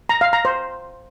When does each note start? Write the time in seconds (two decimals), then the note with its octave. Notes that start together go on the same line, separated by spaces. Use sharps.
0.09 A#5
0.21 F5
0.33 A#5
0.45 C5